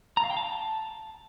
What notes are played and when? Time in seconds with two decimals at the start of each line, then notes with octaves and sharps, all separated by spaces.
0.17 A#5
0.24 F5
0.30 G5
0.37 A5